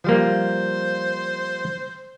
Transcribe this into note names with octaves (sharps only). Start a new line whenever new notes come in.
F3 G3 A#3 C5